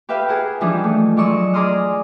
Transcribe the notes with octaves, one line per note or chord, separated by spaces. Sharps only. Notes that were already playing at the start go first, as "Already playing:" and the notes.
G4 B4 E5 F5 G5
G#4 A#4 F#5
E3 F3 G3 D4 D#4
A3
F#3 G#3 D5 D#5 C#6 E6
G#4 D5 A#5 C6 D#6 F6